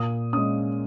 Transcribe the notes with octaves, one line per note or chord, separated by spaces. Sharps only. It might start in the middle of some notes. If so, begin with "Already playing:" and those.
Already playing: A#2 D#6
G#3 C#4 D#6